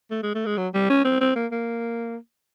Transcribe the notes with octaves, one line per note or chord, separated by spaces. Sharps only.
A3
G#3
A3
G#3
F#3
G3
C#4
C4
C4
A#3
A#3